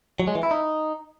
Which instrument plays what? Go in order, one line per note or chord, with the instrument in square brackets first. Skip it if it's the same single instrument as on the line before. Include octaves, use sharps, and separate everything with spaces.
[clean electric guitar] F#3
G#3
E3
E4
D#4